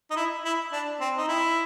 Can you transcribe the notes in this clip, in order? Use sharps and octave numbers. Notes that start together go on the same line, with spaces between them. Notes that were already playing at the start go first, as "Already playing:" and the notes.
D#4
E4
E4
D4
C4
D#4
E4